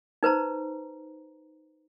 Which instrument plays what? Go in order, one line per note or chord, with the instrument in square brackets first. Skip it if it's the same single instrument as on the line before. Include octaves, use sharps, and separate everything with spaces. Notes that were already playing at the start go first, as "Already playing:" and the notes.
[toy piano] D#4 B4 C5 A#5